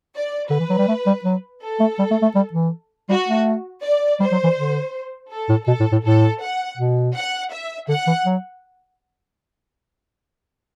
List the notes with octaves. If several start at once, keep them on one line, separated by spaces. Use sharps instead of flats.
D5
D3 B4
E3
F#3
G3
A3
G3
F#3
A4
A3
G3
A3
A3
G3
E3
G3 F#4
A3
D5
G3 C5
F#3
E3
D3
A4
A2
B2 A4
A2
A2
A2 A4
F#5
B2
F#5
E5
D3 F#5
E3
F#3